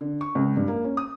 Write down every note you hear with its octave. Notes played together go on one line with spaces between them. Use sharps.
D3
C#6
C#2
G2
A#3
C#4
D#6